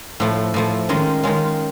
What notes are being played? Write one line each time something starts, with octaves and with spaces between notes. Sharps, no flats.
A2 F3 A3
A2 F3 A3
D#3 G#3 C#4 F4
D#3 G#3 C#4 F4